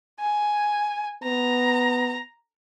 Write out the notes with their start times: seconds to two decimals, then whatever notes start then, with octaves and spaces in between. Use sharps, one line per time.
0.20 G#5
1.23 B3 A#5